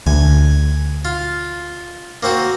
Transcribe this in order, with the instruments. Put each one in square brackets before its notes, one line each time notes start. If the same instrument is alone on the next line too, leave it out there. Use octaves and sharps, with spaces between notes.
[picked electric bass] D2 [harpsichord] G#5
[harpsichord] F4
A#3 C4 F#4